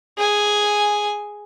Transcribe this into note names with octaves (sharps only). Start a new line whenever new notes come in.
G#4 G#5